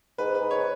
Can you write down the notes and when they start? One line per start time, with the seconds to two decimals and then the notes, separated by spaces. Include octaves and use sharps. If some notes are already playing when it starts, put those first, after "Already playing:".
0.18 G#2 B4
0.35 B4
0.40 G#2
0.51 C#5